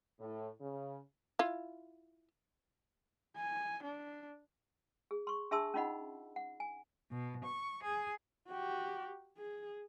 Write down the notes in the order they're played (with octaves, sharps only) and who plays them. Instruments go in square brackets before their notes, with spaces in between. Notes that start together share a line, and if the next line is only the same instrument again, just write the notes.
[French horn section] A2
C#3
[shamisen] E4 F4
[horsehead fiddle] G#5
D4
[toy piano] G#4
C6 C#6
D4 G#4 E5 A5 C6 E6
C#4 D#4 F4 D#5 F#5 B5
F#5
G#5
[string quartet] B2
C#6
G#4
[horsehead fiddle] F#4 G4
G#4